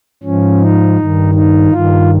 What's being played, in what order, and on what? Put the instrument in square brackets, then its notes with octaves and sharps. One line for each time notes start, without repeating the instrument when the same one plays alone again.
[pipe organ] G#2 F3 C#4
D#4
G2 D#3
D#4
G2 D#3 F4